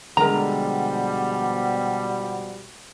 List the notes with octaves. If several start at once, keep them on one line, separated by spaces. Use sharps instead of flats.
B2 D3 F3 G3 G#3 A#4 F#5 A#5